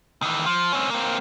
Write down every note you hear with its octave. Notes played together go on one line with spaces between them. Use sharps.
D#3 E3
F3
C4 C#4
A#3 C4